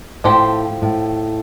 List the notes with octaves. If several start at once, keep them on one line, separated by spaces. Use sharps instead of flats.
A2 F3 C4 G4 C5
A2